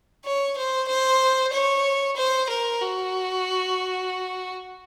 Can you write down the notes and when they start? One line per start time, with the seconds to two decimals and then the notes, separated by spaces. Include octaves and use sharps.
0.25 C#5
0.58 C5
0.88 C5
1.53 C#5
2.16 C5
2.49 A#4
2.81 F#4